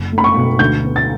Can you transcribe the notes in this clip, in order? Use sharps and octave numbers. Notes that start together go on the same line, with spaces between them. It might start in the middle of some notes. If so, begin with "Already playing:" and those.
Already playing: F#1
A3
B5
C#6
B2
D2 G6
B3
A6